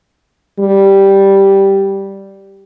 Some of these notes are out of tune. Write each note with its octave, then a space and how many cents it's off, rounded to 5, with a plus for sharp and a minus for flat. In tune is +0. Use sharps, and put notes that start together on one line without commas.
G3 -5